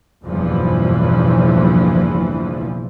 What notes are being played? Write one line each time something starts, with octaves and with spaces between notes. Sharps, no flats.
F#1 B1 E2 G2 E3 F3